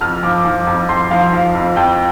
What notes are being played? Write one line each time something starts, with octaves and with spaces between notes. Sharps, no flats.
F2 F6
F3 D6
F3
F2
F2 C6
F3 F5
F3
F2
F2 G5